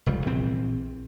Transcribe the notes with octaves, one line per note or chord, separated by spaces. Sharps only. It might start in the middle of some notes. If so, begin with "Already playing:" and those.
F1 C#2 G3
A#1 E3 C4